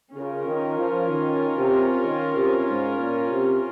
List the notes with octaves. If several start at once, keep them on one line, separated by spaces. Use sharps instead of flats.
C#3 C#4 F4 A#4
D#3
F3
D#3
C3
D#3
C3
G#2
A#2
C3